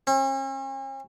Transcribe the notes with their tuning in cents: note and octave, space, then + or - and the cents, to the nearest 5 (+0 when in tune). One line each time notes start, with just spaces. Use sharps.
C#4 -45